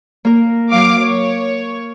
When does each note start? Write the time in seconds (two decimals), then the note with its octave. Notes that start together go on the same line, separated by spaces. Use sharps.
0.25 A#3 A#4
0.71 F#3 F5 D6
1.04 C#5